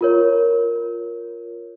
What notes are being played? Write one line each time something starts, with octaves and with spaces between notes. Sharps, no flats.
F4 A#4 C#5